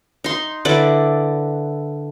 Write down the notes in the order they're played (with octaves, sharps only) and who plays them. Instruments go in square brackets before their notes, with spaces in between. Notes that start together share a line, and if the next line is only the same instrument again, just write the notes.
[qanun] D#4 C6
D3 E4 B4 D5